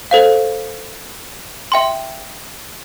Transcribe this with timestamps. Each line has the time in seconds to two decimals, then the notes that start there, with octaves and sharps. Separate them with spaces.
0.11 A4 C5 F5
1.72 E5 G5 C6